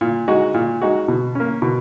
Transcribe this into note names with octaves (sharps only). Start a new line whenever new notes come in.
A#2
G#3 D#4 F#4
A#2
G#3 D#4 F#4
B2
A#3 C#4
B2